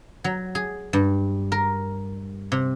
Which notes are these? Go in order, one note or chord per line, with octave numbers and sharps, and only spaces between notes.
F#3
G#4
G2
A#4
C3